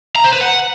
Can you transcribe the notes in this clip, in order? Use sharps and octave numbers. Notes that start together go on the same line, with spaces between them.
A#5
C5
B4
F#5